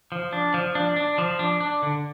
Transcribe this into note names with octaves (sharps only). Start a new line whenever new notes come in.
F3
D4
F3
D4
D4
F3
D4
D4
D3